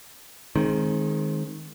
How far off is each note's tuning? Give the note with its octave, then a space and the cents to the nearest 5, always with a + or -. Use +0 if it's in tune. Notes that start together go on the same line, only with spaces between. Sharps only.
D#3 +0 G#3 +25 C4 +20